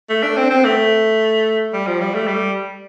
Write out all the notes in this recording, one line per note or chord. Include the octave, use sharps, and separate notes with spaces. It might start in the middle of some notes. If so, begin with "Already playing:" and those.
A3
D4
C4
C4
A3
G3
F3
G3
A3
G3